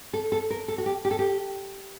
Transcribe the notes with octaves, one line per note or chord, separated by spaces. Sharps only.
A4
A4
A#4
A4
F#4
G4
G4
A4
G4